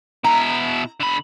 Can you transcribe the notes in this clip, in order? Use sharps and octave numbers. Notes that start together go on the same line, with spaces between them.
B2 E4 A#5
D3 B5